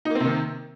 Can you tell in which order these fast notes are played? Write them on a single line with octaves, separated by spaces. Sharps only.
D#4 A#3 C4 C3 D#3